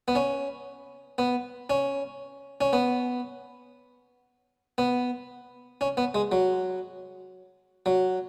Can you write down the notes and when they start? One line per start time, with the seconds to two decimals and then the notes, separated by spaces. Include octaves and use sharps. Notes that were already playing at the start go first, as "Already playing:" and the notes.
0.08 B3
0.15 C#4
1.18 B3
1.70 C#4
2.61 C#4
2.73 B3
4.78 B3
5.81 C#4
5.97 B3
6.14 G#3
6.32 F#3
7.86 F#3